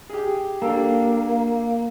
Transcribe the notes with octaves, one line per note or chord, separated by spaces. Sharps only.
G4 G#4
A#3 D4 G4 A4